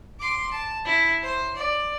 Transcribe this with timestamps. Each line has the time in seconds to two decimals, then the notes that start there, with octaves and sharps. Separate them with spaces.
0.20 C6 D6
0.52 A5
0.85 E4
1.23 C5
1.56 D5